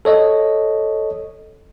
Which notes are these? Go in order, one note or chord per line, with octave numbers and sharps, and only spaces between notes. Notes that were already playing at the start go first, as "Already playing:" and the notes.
A4 C#5 D#5